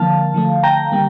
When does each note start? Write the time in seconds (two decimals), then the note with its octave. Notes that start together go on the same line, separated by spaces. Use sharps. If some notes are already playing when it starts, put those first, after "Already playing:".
Already playing: D3 F3 A#3 F5 A5
0.34 D3 F3 A3
0.63 G5 A#5
0.92 D3 G3 A#3